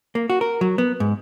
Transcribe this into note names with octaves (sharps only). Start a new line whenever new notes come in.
A#3
F#4
A#4
F#3
B3
G#2